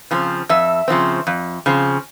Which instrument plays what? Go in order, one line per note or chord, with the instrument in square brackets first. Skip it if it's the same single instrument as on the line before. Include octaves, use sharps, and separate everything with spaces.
[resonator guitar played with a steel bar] C#3 F3 C4
F2 E5
C#3 F3 C4
F2
C#3 F3 C4